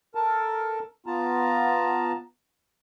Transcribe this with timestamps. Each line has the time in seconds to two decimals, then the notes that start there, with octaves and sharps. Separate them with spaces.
0.15 A4 A#4 A5
1.06 B3 F4 A5 A#5